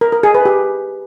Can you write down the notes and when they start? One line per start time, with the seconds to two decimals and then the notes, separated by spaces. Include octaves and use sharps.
0.01 A#4
0.12 A#4
0.23 G#4
0.34 B4
0.45 G4